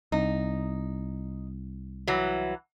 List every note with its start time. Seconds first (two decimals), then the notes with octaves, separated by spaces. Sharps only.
0.12 C2 D#4
2.07 E3 F#3